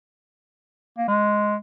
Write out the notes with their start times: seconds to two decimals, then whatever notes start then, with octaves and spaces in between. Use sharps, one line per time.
0.98 A#3
1.08 G#3